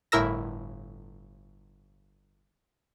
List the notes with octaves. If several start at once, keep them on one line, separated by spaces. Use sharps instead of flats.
G1 A2 E4 A#4 E6 A#6